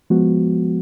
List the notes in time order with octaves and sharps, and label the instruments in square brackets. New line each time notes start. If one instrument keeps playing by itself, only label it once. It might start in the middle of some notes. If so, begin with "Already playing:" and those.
[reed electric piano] F3 G#3 B3 F#4